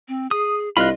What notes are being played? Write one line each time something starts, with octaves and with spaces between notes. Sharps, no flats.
C4
G#4 D#6
C2 F4 D#5 B5 F#6